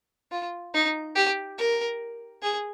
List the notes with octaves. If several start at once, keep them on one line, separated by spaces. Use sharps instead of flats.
F4
D#4
G4
A#4
G#4